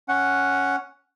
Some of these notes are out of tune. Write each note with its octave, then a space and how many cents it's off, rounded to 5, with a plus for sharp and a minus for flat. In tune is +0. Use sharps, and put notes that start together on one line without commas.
C#4 +0 F#5 +0